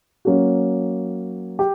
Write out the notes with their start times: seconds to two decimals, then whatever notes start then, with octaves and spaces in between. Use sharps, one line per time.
0.25 F#3 A#3 C#4 F#4
1.59 G4